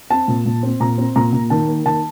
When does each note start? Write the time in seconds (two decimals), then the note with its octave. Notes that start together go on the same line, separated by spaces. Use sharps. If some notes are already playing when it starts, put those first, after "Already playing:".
0.10 C4 A5
0.28 A#2
0.46 A#2
0.63 C4
0.80 A#2 A#5
0.98 C4
1.16 A#2 A#5
1.33 A#2
1.50 D#3 A5
1.68 A#3
1.86 D#3 A5